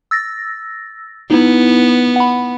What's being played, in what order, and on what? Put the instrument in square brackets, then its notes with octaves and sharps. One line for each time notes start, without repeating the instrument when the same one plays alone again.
[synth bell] E6 A6 A#6
[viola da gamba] B3 [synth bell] D#4 E4
[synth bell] F#5 B5